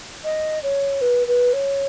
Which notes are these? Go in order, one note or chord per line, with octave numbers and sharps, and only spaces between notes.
D#5
C#5
B4
B4
C#5